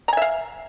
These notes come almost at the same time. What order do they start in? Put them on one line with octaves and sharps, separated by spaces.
A#5 G#5 E5 F5